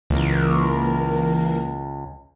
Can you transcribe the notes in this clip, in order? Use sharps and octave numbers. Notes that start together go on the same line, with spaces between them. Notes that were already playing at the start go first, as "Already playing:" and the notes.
C#2 E3 A#3 A#4